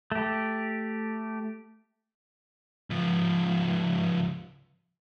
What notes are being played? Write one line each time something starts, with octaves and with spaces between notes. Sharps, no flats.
A3 G4
C#2 F3